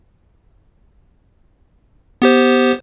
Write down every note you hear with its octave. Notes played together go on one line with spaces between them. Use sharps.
B3 G4 C5